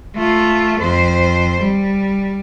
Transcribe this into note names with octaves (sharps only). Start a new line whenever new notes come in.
A3 F4
F2 C5
G3